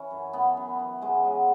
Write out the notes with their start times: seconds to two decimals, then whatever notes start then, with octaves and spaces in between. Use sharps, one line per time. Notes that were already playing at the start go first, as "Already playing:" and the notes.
Already playing: E3 C#4 E4
0.11 F#2
0.33 F#2 B3
0.57 F#2
0.79 E3
1.02 B2 G#3
1.25 F#3